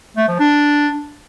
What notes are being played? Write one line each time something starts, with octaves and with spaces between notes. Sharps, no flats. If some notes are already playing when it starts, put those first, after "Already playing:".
A3
F3
D4